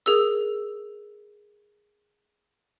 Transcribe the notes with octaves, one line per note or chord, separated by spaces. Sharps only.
G#4 A#4 E6